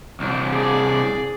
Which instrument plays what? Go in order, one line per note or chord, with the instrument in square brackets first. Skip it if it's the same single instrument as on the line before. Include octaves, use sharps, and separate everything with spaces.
[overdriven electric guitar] C2 D4
[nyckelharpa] G#4 D5